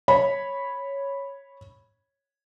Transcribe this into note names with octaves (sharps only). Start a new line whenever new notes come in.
C#5 B5